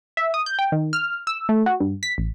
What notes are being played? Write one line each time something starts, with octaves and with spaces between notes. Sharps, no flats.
E5
D#6
G6
G5
D#3
F6
E6
A3
F#4
G2
B6
A1